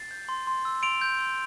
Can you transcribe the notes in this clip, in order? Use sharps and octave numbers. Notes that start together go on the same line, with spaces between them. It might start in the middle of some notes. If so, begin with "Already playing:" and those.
Already playing: A6 C7
G6
C6
C6
E6
C6 D7 F7
G6
C6